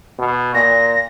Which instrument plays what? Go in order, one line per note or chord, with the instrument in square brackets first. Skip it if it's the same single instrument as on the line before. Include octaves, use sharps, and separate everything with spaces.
[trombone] B2
[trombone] A#2 [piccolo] A#6